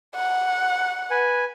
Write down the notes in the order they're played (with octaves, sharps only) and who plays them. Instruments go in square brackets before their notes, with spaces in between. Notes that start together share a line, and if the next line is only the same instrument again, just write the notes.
[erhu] F#5
[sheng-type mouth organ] B4 G#5